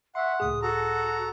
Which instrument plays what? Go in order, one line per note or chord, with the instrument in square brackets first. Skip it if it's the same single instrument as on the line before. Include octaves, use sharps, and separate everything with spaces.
[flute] E5 [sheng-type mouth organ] F#5 [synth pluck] C6 C#6
[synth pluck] C#2 A2 G#4 [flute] D#6
[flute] F#4 [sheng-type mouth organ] A4 A#5